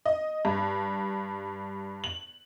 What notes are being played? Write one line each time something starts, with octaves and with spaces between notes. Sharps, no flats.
D#5
G2
F#7